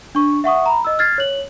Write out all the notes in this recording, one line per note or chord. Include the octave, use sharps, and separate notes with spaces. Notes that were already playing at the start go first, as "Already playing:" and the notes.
D4 C#6
E5 F#5 C#6 D#6
A#5 B5
D#5 E6
F6 G#6 A6 C7
C#5 F#7